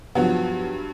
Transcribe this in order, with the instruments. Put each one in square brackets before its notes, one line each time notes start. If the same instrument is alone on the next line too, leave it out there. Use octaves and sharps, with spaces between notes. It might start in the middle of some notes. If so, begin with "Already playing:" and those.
[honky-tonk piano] G2 F#3 [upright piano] F3 B3